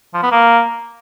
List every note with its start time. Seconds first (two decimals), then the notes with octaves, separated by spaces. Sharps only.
0.14 F3
0.23 B3
0.31 A#3